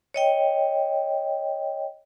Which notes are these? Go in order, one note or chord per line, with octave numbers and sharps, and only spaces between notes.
C#5 D#5 G5